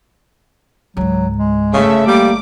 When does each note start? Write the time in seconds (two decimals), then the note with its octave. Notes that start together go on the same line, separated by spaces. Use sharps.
0.97 C#2 G#2 F#3
1.38 G#3
1.74 G1 C#3 A3 E5
2.07 G3 A#3 D6